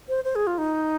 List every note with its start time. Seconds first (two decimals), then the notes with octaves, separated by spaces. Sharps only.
0.09 C5
0.24 C5
0.35 G#4
0.47 F4
0.58 D#4